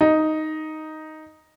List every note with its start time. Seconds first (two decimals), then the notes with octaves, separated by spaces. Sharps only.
0.01 D#4